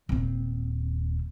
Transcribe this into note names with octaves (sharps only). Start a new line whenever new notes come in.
D#1 C4